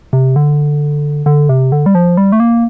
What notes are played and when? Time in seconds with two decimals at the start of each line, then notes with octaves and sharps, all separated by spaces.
0.13 C3
0.36 D3
1.26 D3
1.49 C3
1.72 D3
1.86 G3
1.95 F3
2.17 G3
2.32 A3
2.40 A#3